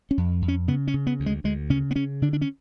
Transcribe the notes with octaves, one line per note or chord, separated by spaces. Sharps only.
C#4
F2
F2
C#4
C#3 B3
C#4
C#3
B3
D2
G#3
D2 G#3
C#3 C#4
B3
C#3 C#4
D3 D4
D4
C#4